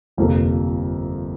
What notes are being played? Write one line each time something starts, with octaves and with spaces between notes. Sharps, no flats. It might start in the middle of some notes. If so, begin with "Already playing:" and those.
G1 F2 C3 F3 A#3